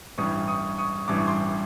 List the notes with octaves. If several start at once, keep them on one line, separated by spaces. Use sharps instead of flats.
A1 G2 E3 G3 C#6 D#6
C#6 D#6
C#6 D#6
A1 G2 E3 G3 D6
C#6
C6 D6